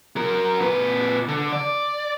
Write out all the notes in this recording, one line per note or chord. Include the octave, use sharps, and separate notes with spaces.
F#3 A#4
A#2 B4
D3
D5